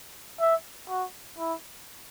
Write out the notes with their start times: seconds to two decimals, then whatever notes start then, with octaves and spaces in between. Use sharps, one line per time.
0.40 E5
0.89 F#4
1.39 E4